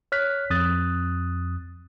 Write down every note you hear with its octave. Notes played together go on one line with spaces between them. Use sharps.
C#5 F6 F#6 B6
F2 D#6 F#6 A6